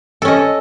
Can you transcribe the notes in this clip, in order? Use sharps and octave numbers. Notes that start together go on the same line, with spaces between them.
C#4 A4 D#5